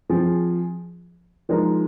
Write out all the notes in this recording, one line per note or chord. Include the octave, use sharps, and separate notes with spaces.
F3 C4 G#4
F3 G#3 D#4 A#4